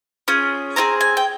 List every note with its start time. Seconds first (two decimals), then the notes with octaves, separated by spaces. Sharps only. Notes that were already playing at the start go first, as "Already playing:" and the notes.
0.28 C#4 F4 G#4
0.76 C4 F4 G#4 A#5
1.01 G#5
1.17 G5